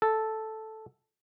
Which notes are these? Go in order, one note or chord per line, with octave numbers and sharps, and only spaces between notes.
A4